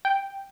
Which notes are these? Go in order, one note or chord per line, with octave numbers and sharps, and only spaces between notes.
G5